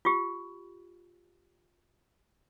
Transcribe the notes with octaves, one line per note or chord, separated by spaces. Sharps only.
F4 G4